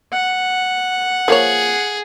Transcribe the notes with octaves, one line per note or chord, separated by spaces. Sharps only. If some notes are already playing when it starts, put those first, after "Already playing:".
F#5
F3 A#3 G#4 C#5